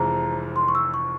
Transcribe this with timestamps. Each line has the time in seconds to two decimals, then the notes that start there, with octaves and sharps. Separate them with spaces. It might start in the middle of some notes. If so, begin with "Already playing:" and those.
Already playing: F1 F2 E3 G#3 A#5
0.56 C6
0.68 C#6
0.75 E6
0.94 C#6